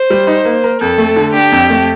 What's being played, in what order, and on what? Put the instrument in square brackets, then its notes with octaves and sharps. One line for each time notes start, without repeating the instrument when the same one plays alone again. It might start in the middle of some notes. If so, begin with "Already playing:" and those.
Already playing: [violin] C5
[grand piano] G3
D#4
A#3
A#4
[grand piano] F2 [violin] A4
[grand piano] A3
D3
[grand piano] D4 [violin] G4
[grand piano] F2
A3